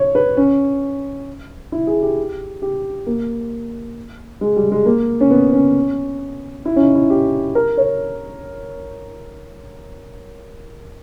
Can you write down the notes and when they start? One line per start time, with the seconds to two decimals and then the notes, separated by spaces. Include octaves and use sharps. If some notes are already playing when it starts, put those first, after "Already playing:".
Already playing: C#5
0.15 B4
0.37 C#4
1.72 E4
1.87 G#4
2.02 G4
2.62 G4
3.07 A#3
4.41 G#3
4.56 G3
4.72 G#3
4.86 A#3
5.21 C#4
5.31 B3
5.53 C#4
6.65 E4
6.76 C#4
6.80 D#4
6.95 E4
7.10 G4
7.55 A#4
7.77 C#5